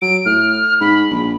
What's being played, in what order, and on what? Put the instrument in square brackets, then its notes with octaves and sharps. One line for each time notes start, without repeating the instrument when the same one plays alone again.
[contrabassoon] F#3 [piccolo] D7
[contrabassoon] A2 [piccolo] F6
[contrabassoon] G#2 [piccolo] B5
[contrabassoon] A#1